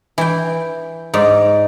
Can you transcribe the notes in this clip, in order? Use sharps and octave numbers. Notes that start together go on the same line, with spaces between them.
E3 G5
G#2 D#4 D5